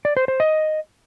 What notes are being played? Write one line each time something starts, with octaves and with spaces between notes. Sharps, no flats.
D5
C5
C5
D#5